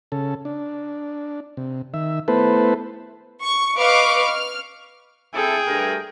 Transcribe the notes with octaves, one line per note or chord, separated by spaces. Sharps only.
C#3 A4
D4
C3
D#3 E5
A3 B3 E4 A4 B4 C5
C#6
B4 D#5 F5 C#6 D6 F6
F6
C4 E4 G#4 A4 G5
G2 A3 A#4